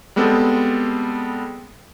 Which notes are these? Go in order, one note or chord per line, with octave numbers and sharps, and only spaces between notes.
G3 G#3 B3 C4 A4